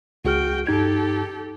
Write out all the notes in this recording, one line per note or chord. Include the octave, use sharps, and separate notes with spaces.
C#2 F#4 G#4 G5 F6
G2 D#4 G4 A4 G#6